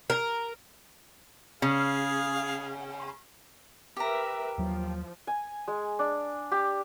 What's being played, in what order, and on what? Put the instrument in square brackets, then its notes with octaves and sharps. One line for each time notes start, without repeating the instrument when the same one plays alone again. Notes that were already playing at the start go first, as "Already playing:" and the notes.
[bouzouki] A#4
[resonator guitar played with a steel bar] C#3 [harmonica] G#4 F5
[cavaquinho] G4 A#5 [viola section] A#4 B4 E5
[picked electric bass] D#2 F#3 [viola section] F3
[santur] G#5
G#3
D4
G4